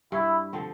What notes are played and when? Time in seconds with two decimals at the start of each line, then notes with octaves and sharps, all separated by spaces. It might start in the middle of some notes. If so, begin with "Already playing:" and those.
0.12 G2 E4
0.53 D3 F3 C4